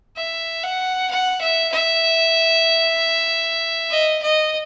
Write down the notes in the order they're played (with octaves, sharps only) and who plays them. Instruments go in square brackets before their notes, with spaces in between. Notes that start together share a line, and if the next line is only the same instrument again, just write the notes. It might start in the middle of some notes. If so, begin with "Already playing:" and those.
[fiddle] E5
F#5
F#5
E5
E5
D#5
D#5